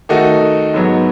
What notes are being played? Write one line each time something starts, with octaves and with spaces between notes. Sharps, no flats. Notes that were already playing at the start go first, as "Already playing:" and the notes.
D#3 A3 D#4 F#4
G#2 F#3 B3